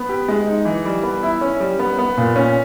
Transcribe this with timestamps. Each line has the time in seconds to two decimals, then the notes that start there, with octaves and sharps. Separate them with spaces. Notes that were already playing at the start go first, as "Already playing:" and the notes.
Already playing: B3
0.09 G4
0.29 G#3
0.47 D#4
0.65 E3
0.85 G3
1.03 B3
1.23 E4
1.41 C#4
1.60 G3
1.79 B3
1.98 B3
2.17 A#2
2.36 C#4